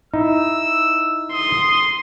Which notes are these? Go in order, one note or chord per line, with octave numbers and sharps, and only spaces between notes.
D#4 E4 E6
C6 D#6